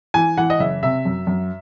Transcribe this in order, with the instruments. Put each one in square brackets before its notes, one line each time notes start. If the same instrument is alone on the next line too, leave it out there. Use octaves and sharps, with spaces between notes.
[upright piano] E3 G#5
E3 F#5
D#5
F#1 E5
C3 E5
F#2
F#2